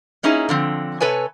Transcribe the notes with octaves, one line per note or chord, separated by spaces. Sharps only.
A#3 C#4 D#4 E4 G#4
D3 F3 C4
C3 A4 B4 C#5 G#5